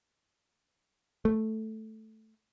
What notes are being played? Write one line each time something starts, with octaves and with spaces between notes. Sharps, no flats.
A3